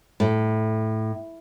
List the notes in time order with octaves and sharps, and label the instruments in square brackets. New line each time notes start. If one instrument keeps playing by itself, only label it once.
[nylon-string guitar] A2